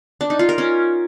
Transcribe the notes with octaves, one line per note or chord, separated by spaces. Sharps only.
D4
D#4
F4
A#4
C#4